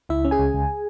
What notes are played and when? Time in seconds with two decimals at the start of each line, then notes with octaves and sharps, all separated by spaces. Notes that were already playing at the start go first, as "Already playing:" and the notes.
0.09 C#2 E4 E5
0.25 C#4
0.31 G#4 G#5
0.39 C#2
0.54 C#2